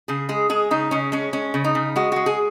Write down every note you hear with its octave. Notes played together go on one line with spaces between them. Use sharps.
C#3 G#4
G#3 G#4
G#3 G#4
C#3 D#4
C#3 C#4
G#3 C#4
G#3 C#4
C#3
D#4
C#3
G#3 F#4
G#3 F#4
G#4